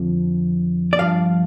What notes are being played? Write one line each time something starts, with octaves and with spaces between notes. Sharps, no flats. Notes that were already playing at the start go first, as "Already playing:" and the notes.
Already playing: F2 D3 F3
D5
G2 F3 F5